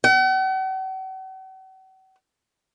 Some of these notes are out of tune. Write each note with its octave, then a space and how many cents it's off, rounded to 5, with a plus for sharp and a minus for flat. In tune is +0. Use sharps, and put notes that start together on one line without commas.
F#5 +45